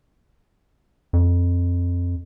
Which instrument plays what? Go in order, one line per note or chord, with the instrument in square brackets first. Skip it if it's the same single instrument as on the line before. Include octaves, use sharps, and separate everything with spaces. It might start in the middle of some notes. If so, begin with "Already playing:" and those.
[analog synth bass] F2